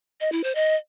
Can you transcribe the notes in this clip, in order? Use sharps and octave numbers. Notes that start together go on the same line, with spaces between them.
D#5
E4
C5
D#5